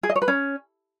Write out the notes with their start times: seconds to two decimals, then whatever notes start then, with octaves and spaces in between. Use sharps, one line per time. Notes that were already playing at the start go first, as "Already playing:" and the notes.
0.03 G#4
0.09 D#5
0.16 C#5
0.22 B4
0.28 C#4